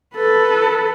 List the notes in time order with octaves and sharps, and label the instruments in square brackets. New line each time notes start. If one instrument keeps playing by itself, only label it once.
[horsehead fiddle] A4 B4